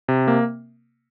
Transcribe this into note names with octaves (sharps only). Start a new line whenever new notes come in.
C3
A#3